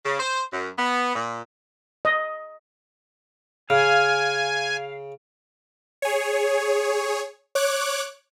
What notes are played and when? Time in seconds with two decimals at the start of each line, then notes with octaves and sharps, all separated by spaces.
0.04 C#3
0.19 C5
0.52 F#2
0.77 B3
1.14 A#2
2.05 D#5
3.70 C#3 F5 G#5
6.02 G#4 C#5
7.55 C#5 D6 F#6